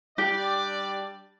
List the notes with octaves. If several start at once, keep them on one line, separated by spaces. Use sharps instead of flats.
G3 D4 G4 D5